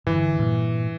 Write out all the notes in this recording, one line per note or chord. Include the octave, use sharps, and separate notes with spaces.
G2 D3 E3
G2 A#2